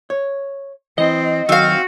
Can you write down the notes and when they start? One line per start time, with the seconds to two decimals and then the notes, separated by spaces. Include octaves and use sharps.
0.10 C#5
0.98 E3 C4 D#5
1.49 D#3 F#3 C4 F#4 F5